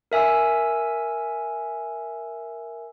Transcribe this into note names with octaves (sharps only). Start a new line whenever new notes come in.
A#4 E5 G#5 E6